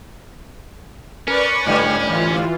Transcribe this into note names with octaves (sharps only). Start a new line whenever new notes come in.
C#4 A#4 B4 D5 C#6
G#2 D3 G3
E3 F4